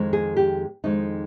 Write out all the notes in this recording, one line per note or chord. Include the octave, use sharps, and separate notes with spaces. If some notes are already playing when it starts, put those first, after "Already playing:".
Already playing: F2 D#3 G#3
G#4
G4
F2 D#3 G#3 D#4